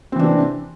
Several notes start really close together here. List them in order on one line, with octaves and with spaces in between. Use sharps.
C4 E3 D4 C3